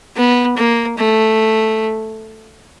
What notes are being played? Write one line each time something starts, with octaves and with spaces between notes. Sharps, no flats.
B3
A#3
A3